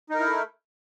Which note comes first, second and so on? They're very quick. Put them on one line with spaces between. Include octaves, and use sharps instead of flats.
D#4 A#4 E4 A3